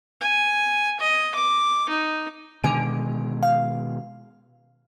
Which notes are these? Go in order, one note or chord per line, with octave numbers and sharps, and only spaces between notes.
G#5
D#5
D6
D#4
B2 D3 D#3 G#3 G#5 D7
F5